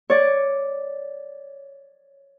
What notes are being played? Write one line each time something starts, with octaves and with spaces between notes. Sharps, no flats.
C#5 D5